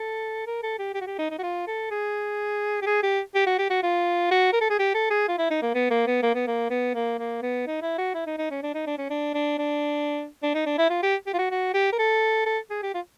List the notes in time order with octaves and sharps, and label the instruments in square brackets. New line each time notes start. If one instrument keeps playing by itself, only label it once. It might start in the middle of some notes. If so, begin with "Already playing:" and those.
Already playing: [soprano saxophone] A4
A#4
A4
G4
G4
F#4
G4
D#4
D#4
F#4
F4
A4
G#4
G4
G#4
G4
G4
F#4
G4
F#4
F4
F#4
A#4
A4
G#4
G4
A4
G#4
F4
E4
D#4
A#3
B3
A#3
B3
A#3
B3
A#3
B3
A#3
A#3
B3
D#4
E4
F#4
E4
D#4
D#4
C#4
D4
D#4
D4
C#4
D4
D4
D4
D4
D#4
D4
E4
F4
G4
G4
F4
F#4
F#4
G4
A#4
A4
A4
G#4
G4
F4